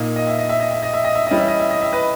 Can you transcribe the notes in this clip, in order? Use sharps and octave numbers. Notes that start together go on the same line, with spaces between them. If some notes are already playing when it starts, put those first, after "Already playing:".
Already playing: A#2 A#3 D#4 D#5
D#5
E5
D#5
E5
D#5
E5
D#5
E5
D#5
E5
E3 G3 C#4 D#5
E5
D#5
E5
D#5
E5
B4 D#5